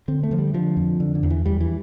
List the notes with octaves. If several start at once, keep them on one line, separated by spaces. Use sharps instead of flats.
D3 C4
A3
D3 F3
G3
D3 F3
F2
D3
D3
E2
E3
E2 G3
E3